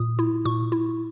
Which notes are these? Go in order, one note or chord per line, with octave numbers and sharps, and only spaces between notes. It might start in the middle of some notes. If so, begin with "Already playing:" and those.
Already playing: A#2 D#6
E4
A#2 C#6
E4